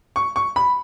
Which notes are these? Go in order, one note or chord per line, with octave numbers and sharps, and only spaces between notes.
C#6
C#6
B5